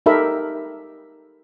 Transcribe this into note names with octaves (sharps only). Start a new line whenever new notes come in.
D#4 G4 A4 A#4 E5 B5